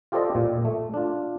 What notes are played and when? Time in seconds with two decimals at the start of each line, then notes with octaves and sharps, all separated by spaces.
0.12 F4 G4 A4 C5 D5 D#5
0.35 A#2
0.65 A3
0.94 D4 F4